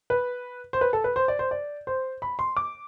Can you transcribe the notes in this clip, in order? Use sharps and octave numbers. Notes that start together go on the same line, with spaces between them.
B4
C5
B4
A4
B4
C5
D5
C5
D5
C5
B5
C6
D6